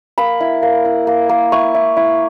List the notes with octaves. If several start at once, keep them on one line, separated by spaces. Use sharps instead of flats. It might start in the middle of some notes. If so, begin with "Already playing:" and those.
A#3 B5
E4
A#3
E4
A#3
A#3
E4 C#6
E4
E4